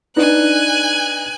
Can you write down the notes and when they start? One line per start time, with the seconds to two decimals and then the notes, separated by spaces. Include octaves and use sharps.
0.16 D4 D#4 B4 G#5 F#6